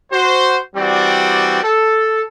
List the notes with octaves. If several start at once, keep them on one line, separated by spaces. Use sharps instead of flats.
F#4 C5
E3 G3 C4 F#4 D5
A4